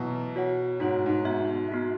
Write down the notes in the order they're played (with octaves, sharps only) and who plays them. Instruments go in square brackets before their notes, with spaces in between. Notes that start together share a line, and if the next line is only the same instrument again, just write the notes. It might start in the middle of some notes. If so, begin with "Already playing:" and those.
Already playing: [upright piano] B2 E3 F#3
[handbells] F#4 C#5 F#5
[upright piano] G#2 [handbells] F#4 C#5 F#5
[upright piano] G#2
[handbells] B3 F#4 E5
B3 F#4 E5